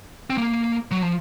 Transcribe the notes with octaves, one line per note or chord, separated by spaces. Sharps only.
C4
A#3
F#3
F3